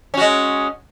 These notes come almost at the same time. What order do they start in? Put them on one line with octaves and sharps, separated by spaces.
C#4 F#4 G#3